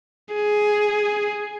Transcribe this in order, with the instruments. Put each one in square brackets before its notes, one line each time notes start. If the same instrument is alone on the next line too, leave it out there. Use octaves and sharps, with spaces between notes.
[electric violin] G#4